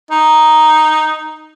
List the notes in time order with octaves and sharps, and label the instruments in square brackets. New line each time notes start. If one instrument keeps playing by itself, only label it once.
[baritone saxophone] D#4